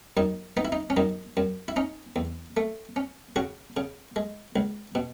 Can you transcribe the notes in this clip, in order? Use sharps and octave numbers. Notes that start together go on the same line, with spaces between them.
F#2 D#4
B3 D#4
E4
D#4
C#4
F#2 D#4
F#2
E4
C#4 D#4
E2
A3
C#4
C#3 F#4
C#3
G#3
C#2
B2